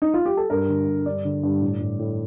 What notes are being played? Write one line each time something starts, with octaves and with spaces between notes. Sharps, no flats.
D#4
F4
G4
A4
G2 A#4
D3
G2
G2 D5
D3
G2
A2
A2
A2